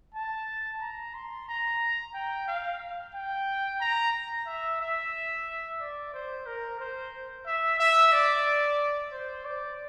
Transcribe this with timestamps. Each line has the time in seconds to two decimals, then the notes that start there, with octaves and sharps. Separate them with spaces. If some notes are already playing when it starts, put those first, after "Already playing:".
0.15 A5
0.81 A#5
1.15 C6
1.49 A#5
2.14 G5
2.48 F5
3.14 G5
3.81 A#5
4.47 E5
4.81 E5
5.80 D5
6.14 C5
6.46 A#4
6.80 C5
7.46 E5
7.80 E5
8.13 D5
9.12 C5
9.45 D5